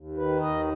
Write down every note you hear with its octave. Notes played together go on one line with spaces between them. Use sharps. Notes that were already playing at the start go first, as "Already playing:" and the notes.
Already playing: D#2
D#3 B4
D#2 D#5